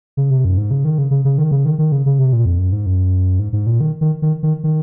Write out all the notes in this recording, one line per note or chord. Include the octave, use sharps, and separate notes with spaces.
C#3
C3
F#2
G#2
C#3
D#3
C#3
C#3
C#3
D#3
C#3
D#3
D#3
C#3
C#3
C3
A#2
F2
F#2
G#2
F#2
G#2
G#2
A#2
D#3
D#3
D#3
D#3
D#3